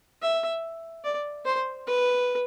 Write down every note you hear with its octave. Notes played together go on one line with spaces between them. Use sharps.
E5
D5
C5
B4